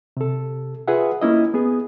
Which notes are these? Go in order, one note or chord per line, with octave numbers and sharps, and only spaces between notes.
C3 A4
F4 G#4 B4 E5 F#5
A#3 C#4 E4 D#5
B3 G#4